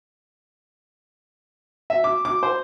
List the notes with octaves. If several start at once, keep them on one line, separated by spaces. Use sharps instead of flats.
E5
D6
D6
C5